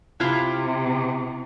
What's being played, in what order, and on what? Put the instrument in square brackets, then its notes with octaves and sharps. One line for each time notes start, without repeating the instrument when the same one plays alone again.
[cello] C3 [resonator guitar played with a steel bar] E4 F4